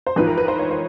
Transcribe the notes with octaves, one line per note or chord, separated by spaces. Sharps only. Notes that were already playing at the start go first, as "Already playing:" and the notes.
C5
A1 G#2 F3 B4
A#4
B4
C5
C#5
C5